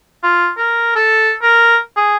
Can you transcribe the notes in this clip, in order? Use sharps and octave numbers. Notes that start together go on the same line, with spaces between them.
F4
A#4
A4
A#4
G#4